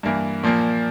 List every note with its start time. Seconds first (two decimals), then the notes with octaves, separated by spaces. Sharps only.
0.03 G2 E3 A#3
0.43 A#2 F3 A#3